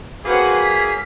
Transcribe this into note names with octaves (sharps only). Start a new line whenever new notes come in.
F#3 A#3 C4 F#4 G#4 B4
B6